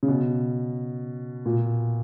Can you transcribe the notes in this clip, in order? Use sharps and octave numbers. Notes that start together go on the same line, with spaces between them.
C#3
B2
A#2